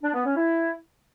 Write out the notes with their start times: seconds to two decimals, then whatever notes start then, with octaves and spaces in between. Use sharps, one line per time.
0.03 D4
0.14 B3
0.25 C#4
0.35 E4